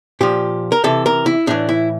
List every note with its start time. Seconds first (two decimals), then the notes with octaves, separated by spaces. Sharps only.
0.21 A#2 F3 G4
0.72 A#4
0.84 C3 E3 A4
1.06 A#4
1.26 E4
1.47 A2 E3 D4
1.69 E4